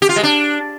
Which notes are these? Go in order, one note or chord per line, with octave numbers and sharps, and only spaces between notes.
G4
F4
G#3
D4